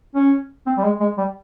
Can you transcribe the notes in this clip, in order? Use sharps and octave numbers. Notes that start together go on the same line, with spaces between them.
C#4
C4
G3
G#3
G#3
G3